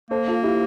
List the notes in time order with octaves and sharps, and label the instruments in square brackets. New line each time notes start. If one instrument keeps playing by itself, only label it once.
[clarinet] A#3 [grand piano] A4 C5
[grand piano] F4 A4
E4 G4